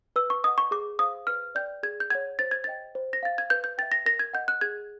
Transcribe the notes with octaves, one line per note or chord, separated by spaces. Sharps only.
B4 E6
C#6
D#5 F#5 D#6
C#6
G#4 D6
C5 F5 D#6
B4 F6
D5 G5 G6
G#4 G#6
G6
C#5 F#5 G#6
C5 A6
G#6
D#5 G5 A6
C5
A#6
F5 A6
G#6
B4 G6
G6
E5 G5 A6
A#6
A#4 A#6
G#6
D#5 F#5 G6
F#6
G#4 G#6